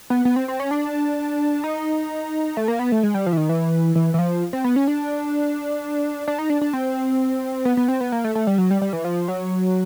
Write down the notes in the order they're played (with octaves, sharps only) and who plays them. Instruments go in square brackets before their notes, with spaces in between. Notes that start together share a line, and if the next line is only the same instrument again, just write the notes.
[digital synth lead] B3
B3
C4
C4
C#4
D4
D#4
A3
A#3
B3
A3
G#3
G3
F3
E3
D#3
E3
E3
E3
F3
C4
B3
C#4
D4
D4
D#4
D4
D4
C4
B3
B3
C4
B3
A#3
A3
A3
G3
F#3
G3
G3
E3
F3
F#3